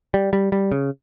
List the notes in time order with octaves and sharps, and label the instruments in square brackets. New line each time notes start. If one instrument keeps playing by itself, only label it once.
[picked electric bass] G3
G3
G3
C#3